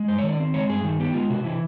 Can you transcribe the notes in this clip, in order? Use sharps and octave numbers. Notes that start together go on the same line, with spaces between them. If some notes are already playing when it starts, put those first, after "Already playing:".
Already playing: G#3
G2 C5
C#5
D#3
D5
C4
G#3 C#5
G2 G#4
D#3
B3 G4
G#3 F4
C3 F#4
E3 E4